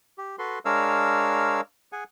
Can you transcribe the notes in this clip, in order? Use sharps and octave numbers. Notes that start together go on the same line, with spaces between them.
G4
F#4 A4 B4 C6
G#3 D4 A#4 C#5 F5 E6
G#4 F#5 G#5